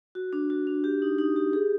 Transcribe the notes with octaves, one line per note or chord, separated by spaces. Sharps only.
F#4
D4
F#4
D4
G4
D#4
D#4
G4
G#4